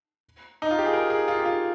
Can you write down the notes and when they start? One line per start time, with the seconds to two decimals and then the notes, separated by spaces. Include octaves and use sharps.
0.62 D#4
0.71 F4
0.78 G4
0.85 G#4
0.93 A#4
1.10 G#4
1.28 F4
1.39 G4
1.46 F4